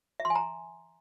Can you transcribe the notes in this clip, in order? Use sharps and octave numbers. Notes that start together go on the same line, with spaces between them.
E5
C6
G#5
A#5